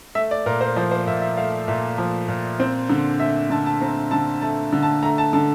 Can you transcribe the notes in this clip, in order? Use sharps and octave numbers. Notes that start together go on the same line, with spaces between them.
A3 E5
D5
A#2 A#4
C5
F3 C5
C5
A#2 E5
E5
A3 F5
A#2 E5
F3
A#2
C4
D3
A3 E5
D3 A5
A5
C4 A#5
D3 A5
A3 A5
D3
A5
A3 A#5
A5
D3 A5